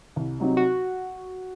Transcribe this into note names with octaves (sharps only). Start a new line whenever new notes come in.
C2
C3 F#3 C4 D#4
F#4